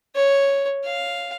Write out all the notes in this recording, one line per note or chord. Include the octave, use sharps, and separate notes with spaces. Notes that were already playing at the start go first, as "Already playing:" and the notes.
C#5
F5